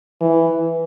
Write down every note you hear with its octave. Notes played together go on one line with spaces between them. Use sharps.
E3